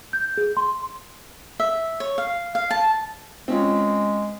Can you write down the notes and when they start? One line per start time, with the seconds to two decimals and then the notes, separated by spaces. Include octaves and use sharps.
0.13 G6
0.37 G#4
0.57 C6
1.60 E5
2.00 C#5
2.18 F5
2.55 F5
2.71 A5
3.48 G#3 C4 C#4 F4